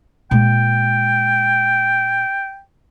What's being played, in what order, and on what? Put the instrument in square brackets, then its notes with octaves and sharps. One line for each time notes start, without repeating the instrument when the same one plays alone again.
[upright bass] A#2 G#3 [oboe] G5